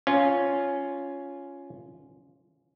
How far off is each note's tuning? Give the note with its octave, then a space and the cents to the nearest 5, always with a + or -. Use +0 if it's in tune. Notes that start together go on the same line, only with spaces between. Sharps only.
C#4 +5 F4 +0